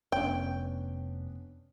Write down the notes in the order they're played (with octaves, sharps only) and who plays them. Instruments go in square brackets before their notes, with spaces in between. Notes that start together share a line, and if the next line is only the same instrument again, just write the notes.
[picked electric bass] F1 [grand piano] B3 C#4 D4 [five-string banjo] G5